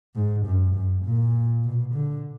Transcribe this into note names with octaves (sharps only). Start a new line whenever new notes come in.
G#2
F#2
F#2
A#2
B2
D3